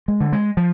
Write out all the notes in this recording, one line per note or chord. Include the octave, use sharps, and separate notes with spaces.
G#3
D3
G#3
F3